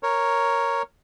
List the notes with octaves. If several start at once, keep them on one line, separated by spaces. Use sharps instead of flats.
A#4 C#5